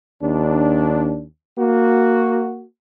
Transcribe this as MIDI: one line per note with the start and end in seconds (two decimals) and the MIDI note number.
0.22 1.24 39
0.22 1.24 62
1.59 2.65 58
1.59 2.65 66